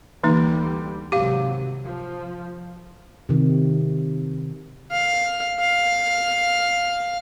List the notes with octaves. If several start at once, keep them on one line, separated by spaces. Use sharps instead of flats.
D2 D3 E3 G3 A#3 D#4
G#1 C3 F#3 G4 F5
F3
C3 D#3
F5
F5